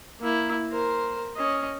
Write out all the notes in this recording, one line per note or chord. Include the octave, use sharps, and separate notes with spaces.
A#3 E4
A#4 C5
C#4 D#5